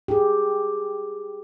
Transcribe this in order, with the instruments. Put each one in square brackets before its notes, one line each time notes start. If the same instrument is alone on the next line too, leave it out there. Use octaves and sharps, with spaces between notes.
[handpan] G4 G#4